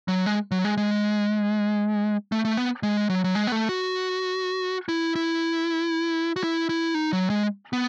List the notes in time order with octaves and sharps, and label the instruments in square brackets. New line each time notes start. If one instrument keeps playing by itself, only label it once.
[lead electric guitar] F#3
G#3
F#3
G#3
G#3
A3
A3
B3
G#3
F#3
F#3
G#3
B3
A3
F#4
E4
E4
F#4
E4
E4
D#4
F#3
G#3
B3